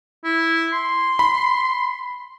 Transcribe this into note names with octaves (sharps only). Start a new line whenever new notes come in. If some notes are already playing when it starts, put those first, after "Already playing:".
E4
C6
B5